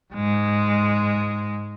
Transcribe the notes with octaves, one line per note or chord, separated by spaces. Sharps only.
G#2 G#3